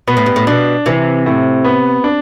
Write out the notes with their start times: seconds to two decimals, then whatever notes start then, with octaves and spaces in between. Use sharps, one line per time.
0.07 B2 B3
0.17 A2
0.26 G2
0.36 A2
0.47 B2 D4
0.86 C3 E3
1.26 A2
1.64 B3
2.04 D4